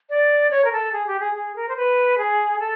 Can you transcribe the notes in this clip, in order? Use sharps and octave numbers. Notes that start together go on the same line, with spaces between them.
D5
C#5
A#4
A4
G#4
G4
G#4
G#4
A#4
C5
B4
G#4
A4